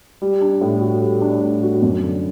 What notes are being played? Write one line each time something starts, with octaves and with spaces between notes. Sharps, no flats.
G3
D4
A2
F#4
G3
D4
A2
F#4
F#2
D3